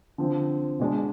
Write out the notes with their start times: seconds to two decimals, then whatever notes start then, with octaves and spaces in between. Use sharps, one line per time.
0.18 D3 F3 C4
0.79 B2 G#3 D4